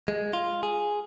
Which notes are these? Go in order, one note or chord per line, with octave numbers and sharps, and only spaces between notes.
G#3
F4
G#4